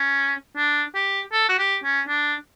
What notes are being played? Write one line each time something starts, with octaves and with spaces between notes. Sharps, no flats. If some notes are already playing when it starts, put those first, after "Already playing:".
Already playing: C#4
D4
G4
A4
F#4
G4
C#4
D4